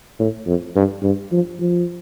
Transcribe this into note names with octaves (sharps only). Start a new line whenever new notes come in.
A2
F2
G2
G2
F3
F3